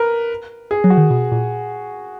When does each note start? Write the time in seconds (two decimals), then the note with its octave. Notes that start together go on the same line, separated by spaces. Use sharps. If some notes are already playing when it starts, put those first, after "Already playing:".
Already playing: A#4 B4
0.71 G#4
0.84 F#3
0.90 F#4
0.97 D#3
1.10 B2
1.32 A#2